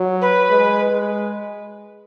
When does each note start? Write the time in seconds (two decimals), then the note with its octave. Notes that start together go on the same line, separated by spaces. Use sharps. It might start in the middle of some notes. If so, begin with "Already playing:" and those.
Already playing: F#3
0.21 B4
0.50 G#3
0.92 G#3